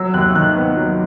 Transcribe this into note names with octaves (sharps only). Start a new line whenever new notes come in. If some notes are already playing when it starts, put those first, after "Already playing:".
Already playing: F#3 E6
D#2 F#6
D#3 F#6
B3
F#3